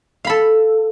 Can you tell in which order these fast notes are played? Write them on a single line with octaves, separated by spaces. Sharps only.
F5 B5 A4